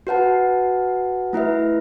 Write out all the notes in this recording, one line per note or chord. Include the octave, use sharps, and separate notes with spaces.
F#4 B4 F#5 A5
A3 E4 B4 E5